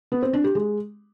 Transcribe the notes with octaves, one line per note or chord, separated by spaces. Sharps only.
B3
C4
D4
G4
G#3